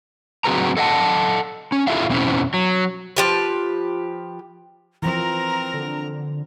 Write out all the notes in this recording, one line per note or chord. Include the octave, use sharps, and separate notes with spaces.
F#3 C4 F#4 G#4 B4 A#5
A4 D#5 F#5 A5
C#4
E4 F4 G#4 A4 E5 F5
E2 B2 A3 C4 C#4 E4
F#3
F3 G4 B4
E3 F3 C4 A#4 A#5
D3